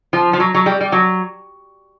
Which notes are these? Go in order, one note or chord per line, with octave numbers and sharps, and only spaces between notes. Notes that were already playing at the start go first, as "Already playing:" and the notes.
F3
F3
F#3
F#3
G3
G3
F#3